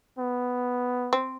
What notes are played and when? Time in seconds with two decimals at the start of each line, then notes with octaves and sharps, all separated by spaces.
0.18 B3
1.13 C4